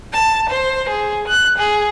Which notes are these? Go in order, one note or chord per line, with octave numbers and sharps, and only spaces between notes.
A5
C5
G#4
F#6
G#4